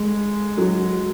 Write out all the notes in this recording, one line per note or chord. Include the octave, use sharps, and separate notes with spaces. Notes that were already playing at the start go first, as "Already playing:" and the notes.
Already playing: G#3
F#3